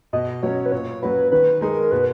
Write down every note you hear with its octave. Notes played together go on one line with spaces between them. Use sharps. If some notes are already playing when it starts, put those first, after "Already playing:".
B2 D#5
F#3 C#4 C#5
B4
A#2 C#5
F#3 C#4 F#4 B4
D#3 B4
G#3 D#4 G#4 A#4
B2 B4